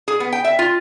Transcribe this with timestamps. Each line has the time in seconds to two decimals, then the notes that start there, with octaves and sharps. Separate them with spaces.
0.08 G#4
0.20 B3
0.32 G5
0.44 E5
0.59 F4